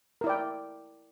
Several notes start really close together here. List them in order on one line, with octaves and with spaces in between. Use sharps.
A#4 E4 D5 G5